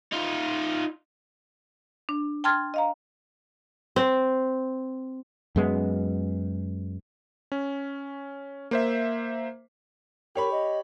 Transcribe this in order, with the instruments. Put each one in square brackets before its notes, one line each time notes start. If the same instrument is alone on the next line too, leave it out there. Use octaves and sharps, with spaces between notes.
[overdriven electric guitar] D#4 F4
[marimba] D4
G5 A5 C6 F6 G#6 A6
D#5 F5 A#5
[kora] C4
[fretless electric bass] F#2 G#3 B3
[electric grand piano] C#4
A#3 C5 E5
[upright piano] G4 C#5 B5 [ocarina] A#4
[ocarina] D#5